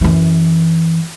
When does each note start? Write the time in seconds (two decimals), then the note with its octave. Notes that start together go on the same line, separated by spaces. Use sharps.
0.01 F#2 E3